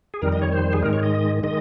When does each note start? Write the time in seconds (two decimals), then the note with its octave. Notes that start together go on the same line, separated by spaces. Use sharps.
0.14 G#4
0.22 F2 D#3 G3 A#4
0.32 D#5
0.42 C#5
0.52 C5
0.73 G#4
0.82 G#2 D#3 G#3 A#4
0.93 C#5
1.03 D#5
1.43 D#3 G#3 D#5